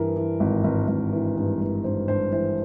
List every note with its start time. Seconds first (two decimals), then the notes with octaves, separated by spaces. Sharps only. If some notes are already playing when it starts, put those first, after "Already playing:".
Already playing: G2 E3 A#4
0.16 E3
0.40 G#1
0.64 G#1
0.88 G#1
1.13 E3
1.36 G2
1.61 G#1
1.84 G2 C5
2.08 G2 C5
2.32 E3 C5